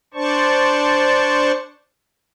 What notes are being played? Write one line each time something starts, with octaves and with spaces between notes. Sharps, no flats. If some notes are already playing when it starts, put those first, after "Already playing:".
D4 C5 D5 A5 C#6